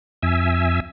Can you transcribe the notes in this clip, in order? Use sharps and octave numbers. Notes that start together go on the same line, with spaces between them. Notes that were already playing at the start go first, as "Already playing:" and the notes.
F2 E5 G#5 E6